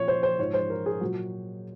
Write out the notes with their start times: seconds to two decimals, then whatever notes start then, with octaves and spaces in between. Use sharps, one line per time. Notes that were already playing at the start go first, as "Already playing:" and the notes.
Already playing: A#2 F3 C#5
0.08 C5
0.23 C5
0.39 G#2 F3 C#5
0.54 C5
0.70 A#4
0.86 G#4
1.01 A#2 F#3 F#4